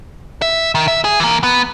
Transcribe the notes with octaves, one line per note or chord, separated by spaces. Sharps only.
E5
D#3
E5
G#4
E3 A#3
B3